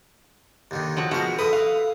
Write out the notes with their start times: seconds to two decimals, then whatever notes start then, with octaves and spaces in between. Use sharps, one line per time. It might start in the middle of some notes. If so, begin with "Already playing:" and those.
0.71 D#2 D3 D#3
0.97 F3 F#3 F#4
1.11 B2 F3 G#3 F#4 A#4
1.39 A4 B4 E5 F#5 D#6
1.53 F5